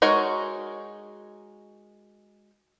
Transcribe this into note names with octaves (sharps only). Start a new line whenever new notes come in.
G#3 D#4 F#4 A#4 C#5